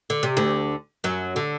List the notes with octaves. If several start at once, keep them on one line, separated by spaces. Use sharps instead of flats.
D3
C3
D2 D3
F#2 F#3
D3